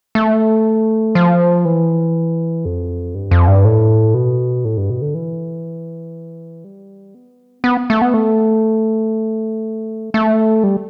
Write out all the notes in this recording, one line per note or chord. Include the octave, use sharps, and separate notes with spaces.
A3
F3
E3
F2
G2
F2
G2
A2
B2
A2
G2
B2
D3
E3
G3
B3
B3
A3
B3
A3
A3
G3